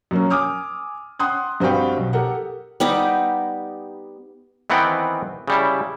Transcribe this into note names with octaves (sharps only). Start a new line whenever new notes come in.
F#2 A#3 C#4
G#5 D6 D#6 F6
F#5 G5 C6 D#6 F#6
G2 C4 F#4 B4 F5 G5
B1
G4 A4 A#4 F#5
G3 B3 D#4 G4
D#3 E3 B3 C4 F#5 G5
C#3 G3 E4